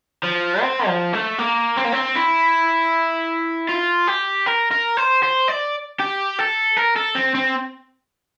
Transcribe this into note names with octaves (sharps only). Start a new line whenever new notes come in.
F3
C4
F3
A3
A#3
C4
A#3
C4
E4
F4
G4
A#4
A#4
C5
C5
D5
G4
A4
A#4
A4
C4
C4